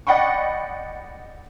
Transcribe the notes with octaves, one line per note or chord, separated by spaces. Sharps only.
D5 D#5 F#5 G5 B5 C#6